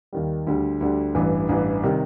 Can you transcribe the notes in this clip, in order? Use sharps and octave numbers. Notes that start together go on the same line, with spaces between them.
D#2 D#3 G3
D2 D3 G3
D2 D3 G3
A1 G2 E3
A1 G2 E3
C3 D#3 G3